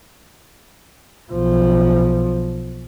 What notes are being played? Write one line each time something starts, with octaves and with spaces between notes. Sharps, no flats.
B1 F3